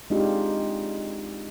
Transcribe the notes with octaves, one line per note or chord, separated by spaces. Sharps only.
G#3 C4 D4 D#4 F4 G4